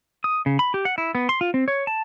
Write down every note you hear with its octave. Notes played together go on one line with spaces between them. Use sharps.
D#6
C#3
B5
G4
F#5
E4
B3
C6
F4
C4
C#5
A5